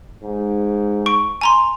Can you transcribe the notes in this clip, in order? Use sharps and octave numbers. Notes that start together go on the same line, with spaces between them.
G#2
C#6 D7
G#5 A#5 C6